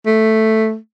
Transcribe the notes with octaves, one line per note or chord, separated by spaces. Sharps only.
A3